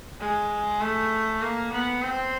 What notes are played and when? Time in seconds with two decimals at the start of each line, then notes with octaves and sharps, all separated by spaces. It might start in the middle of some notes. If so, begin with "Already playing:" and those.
0.20 G#3
0.80 A3
1.41 A#3
1.72 B3
2.02 C4